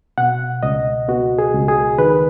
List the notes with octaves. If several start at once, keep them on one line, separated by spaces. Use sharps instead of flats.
B2 F#5
C#2 D#5
B3 F#4
G#4
C#2
G#4
D#3 B4